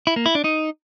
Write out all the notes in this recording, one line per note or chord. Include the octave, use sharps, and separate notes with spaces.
E4
A#3
E4
D4
D#4